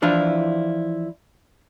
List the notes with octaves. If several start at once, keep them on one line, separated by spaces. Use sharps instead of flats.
E3 F3 D4 E4 F4